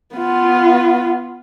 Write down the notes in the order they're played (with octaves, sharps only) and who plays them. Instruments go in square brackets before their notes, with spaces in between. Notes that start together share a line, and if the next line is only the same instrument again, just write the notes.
[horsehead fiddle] B3 F4